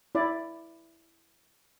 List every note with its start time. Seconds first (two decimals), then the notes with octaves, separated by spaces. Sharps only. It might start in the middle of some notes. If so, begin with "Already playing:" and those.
0.15 E4 D5